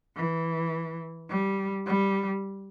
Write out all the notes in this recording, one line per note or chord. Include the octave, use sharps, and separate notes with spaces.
E3
G3
G3